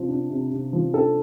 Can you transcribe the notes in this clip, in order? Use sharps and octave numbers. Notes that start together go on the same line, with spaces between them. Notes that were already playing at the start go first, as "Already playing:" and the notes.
Already playing: C3 F3
D4
C3
C3
F3
D4 A4